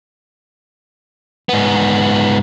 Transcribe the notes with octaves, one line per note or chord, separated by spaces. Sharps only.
G#2 B3